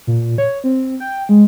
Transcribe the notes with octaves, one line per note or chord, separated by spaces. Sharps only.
A#2
C#5
C4
G5
G#3